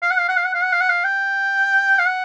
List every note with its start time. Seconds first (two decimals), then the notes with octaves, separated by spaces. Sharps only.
0.02 F5
0.10 F#5
0.19 F5
0.29 F#5
0.37 F5
0.45 F#5
0.55 F5
0.63 F#5
0.72 F5
0.80 F#5
0.89 F5
1.04 G5
1.99 F5
2.06 F#5